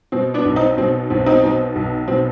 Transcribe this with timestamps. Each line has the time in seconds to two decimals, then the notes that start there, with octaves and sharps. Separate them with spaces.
0.12 B2 C4
0.34 B3 D4
0.45 B1
0.56 C4 D#4
0.77 B2 C4
1.10 B1 C4
1.26 C4 D#4
1.43 B2
1.76 B1
2.08 B2 C4